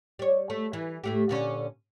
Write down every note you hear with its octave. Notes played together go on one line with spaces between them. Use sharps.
G3 C#5
A3
E3
A2 A3 G4
A#2 D3 C#4